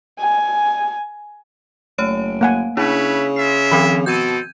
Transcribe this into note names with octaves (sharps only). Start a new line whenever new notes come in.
G#5
F#1 A3 C#5 D7
A#3 F#5 G#5
C#3 D4 E4 B4 C#5 E5
G#3 F4 E5 C7
D#3 F3 C4 B5
B2 C4 A4 G6 G#6 D#7